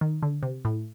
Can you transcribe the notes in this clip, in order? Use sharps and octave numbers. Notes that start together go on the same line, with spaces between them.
D#3
D3
C3
A2